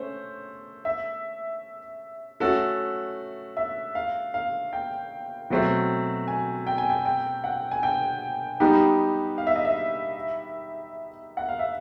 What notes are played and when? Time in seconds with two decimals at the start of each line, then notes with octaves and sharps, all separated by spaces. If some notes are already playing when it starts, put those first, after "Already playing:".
Already playing: A3 C#4 C5
0.85 E5
2.40 A3 C#4 F#4 A4
3.57 E5
3.95 F5
4.34 F5
4.73 G5
5.50 B2 F#3 A3 C4
6.28 G#5
6.67 G5
6.78 G#5
6.90 G5
7.05 G5
7.44 F#5
7.71 G#5
7.83 G5
8.60 G3 B3 D#4 G4
9.38 F5
9.47 E5
9.56 D#5
9.65 E5
11.37 F#5
11.49 F5
11.59 E5